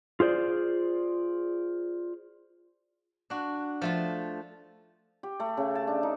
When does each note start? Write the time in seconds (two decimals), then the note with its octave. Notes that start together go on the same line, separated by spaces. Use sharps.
0.20 F4 G#4 C5 D5
3.30 D4 F#4
3.81 F3 A3 F4
5.23 G4
5.40 A3
5.57 C#3
5.75 A5
5.87 D4
6.03 D#4